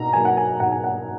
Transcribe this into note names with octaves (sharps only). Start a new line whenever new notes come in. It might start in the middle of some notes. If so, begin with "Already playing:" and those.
Already playing: B2 A#5
F#3 A#3 G#5
F#5
G#5
B2 F#5
G#5
F#5